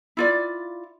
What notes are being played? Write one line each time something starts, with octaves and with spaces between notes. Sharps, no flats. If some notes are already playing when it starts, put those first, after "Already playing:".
E4 F4 D5